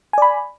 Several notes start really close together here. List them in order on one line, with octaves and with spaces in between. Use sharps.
G#5 D5 B5